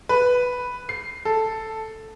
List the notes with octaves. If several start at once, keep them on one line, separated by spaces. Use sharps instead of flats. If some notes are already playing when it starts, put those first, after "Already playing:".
B4
C7
A4